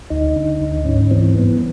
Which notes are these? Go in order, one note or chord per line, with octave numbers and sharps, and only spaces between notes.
D2 D#4
D3
D2
G#2 C#4
E3 C4
G2 B3